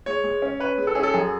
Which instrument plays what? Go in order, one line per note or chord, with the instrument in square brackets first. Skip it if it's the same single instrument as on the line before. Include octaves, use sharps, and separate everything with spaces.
[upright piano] G#3 [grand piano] C#5
[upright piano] G#3
C#4
[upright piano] C#4 [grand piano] B4
[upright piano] G#3
[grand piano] A4
[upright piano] C#4 [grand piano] G#4
[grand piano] A4
[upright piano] F#2 [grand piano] G#4